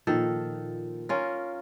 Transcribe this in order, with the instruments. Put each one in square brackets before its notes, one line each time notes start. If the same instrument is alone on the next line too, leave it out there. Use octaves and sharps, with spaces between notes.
[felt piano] A#2 F3 [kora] D#3 A4
[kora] C#4 F4 A#4